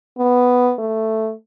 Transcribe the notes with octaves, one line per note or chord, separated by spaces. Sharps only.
B3
A3